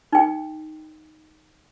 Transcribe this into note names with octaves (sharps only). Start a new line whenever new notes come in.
D#4 G5